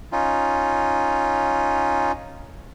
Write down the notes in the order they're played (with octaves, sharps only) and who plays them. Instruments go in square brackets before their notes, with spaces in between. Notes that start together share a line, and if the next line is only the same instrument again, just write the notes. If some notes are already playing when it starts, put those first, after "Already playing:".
[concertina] C#4 D#4 F4